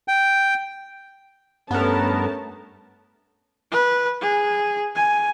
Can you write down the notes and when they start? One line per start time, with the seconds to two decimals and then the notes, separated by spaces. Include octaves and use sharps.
0.08 G5
1.71 G2 A3 B3 C#4 A#4 A5
3.71 B4
4.21 G#4
4.96 G#5